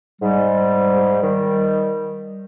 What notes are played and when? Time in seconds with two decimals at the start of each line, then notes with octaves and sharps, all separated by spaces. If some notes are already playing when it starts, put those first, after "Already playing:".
0.21 G#2 G3
1.22 D#3 G3